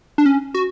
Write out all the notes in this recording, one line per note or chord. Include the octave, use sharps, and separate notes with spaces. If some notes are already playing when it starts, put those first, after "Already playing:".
D4
C#4
F#4